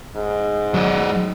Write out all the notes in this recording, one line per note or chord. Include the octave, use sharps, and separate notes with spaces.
G#2
F#3 D5